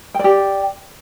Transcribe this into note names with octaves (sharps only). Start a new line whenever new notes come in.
G4 D5 G5